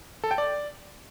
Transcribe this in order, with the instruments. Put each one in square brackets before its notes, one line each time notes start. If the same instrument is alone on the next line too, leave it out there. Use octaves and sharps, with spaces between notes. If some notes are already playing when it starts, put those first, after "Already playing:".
[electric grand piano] A4
G5
D5